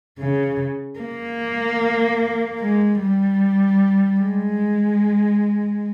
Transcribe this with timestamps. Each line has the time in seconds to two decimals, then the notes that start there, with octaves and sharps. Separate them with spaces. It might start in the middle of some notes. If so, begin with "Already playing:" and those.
0.19 C#3
0.99 A#3
2.60 G#3
3.00 G3
4.20 G#3